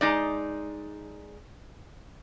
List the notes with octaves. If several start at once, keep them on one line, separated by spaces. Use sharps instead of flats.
G#3 D#4 D5